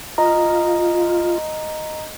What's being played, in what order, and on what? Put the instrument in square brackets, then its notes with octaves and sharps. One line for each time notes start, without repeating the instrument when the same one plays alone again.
[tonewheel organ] F4 [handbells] D#5 A#5